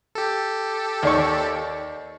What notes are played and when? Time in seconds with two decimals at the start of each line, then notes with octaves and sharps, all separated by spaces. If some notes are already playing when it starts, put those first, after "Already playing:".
0.15 G4 A4
1.03 D#2 D5 C#6